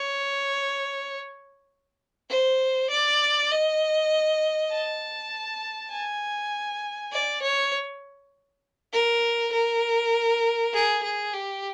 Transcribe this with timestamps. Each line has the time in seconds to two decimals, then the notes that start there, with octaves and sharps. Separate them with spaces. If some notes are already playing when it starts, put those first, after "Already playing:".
Already playing: C#5
2.30 C5
2.91 D5
3.51 D#5
4.71 A5
5.92 G#5
7.12 D5
7.42 C#5
8.93 A#4
9.53 A#4
10.74 G#4
11.03 G#4
11.33 G4